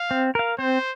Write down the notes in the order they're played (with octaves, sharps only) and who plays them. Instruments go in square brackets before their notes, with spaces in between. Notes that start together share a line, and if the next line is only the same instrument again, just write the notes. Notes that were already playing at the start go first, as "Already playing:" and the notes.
Already playing: [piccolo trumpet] F5
[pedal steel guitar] C4
A#4 F5
[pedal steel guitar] C4 [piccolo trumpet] C5